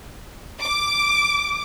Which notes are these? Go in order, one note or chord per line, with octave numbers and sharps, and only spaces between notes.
D6